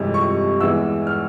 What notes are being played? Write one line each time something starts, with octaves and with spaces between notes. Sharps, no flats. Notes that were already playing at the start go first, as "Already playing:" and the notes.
Already playing: G1 F2 C3 E3 G#3
C#6
E2 E3 G#3 E6
F6